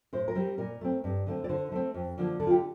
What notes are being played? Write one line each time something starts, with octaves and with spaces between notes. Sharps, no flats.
A2 C5
A#4
G3 C4
A#2 A#4
A3 C4
G2
D3 A3 C4
D5
D3 C5
A3 C4
F2
D3 F3 A#3
D3 A4
F4
G4